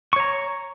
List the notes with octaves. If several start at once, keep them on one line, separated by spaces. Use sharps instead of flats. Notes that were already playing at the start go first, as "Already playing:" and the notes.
C#5 A#5 C#6